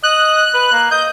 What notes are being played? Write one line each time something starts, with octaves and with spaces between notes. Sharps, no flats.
D#5 F#6
B4
A#3
D#5 G6